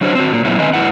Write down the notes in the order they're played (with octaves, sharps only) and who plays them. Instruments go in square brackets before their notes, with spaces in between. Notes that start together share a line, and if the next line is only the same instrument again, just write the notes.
[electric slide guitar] F#3 A3 D4 F#4 C5 C#5
C4 F#4
A#2 A#3
A#2 F#3 B3 C#4 E4
D3 D#3 C4 B4 D#5 G#5
G#2 F3 E4 B4 F#5